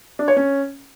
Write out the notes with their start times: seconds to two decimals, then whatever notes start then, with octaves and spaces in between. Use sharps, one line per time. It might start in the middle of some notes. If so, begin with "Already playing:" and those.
0.19 D4
0.28 C#5
0.37 C#4